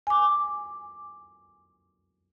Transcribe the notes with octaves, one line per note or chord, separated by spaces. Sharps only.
G#5 D6